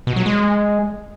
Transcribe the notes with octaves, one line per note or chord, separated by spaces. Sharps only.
B2
F#3
G#3